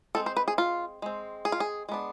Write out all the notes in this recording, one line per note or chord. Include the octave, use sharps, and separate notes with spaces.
G#3 C4 A4
C5
B4
G#4
F4
G#3 C4
G#4
F4
G#4
G#3 B3 D4